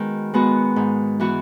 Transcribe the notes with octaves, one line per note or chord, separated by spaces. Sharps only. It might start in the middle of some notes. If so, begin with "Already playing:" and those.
Already playing: D#3 G#3 B3 F#4
G#3 B3 F#4
G#2
E3 B3 F#4